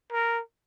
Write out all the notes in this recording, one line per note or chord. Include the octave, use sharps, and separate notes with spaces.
A#4